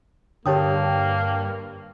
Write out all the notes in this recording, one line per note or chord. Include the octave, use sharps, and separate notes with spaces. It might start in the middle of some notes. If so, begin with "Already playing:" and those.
G2 D3 A#3 G4 C#5 G5 A5 D#6